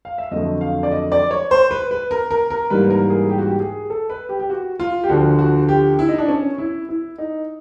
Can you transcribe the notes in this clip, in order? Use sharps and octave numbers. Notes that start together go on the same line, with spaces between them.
F5
E5
F2 D3 F#3 A3 D#5
F5
D5
D#5
D5
C#5
C5
B4
B4
A#4
A#4
A#4
G#2 E3 G3 A#3 B4
A#4
G#4
G4
F#4
G4
G#4
A4
B4
G4
G4
F#4
F4
G4
D2 D3 F3 F#4
F#4
G4
E4
D#4
D4
C#4
E4
E4
D#4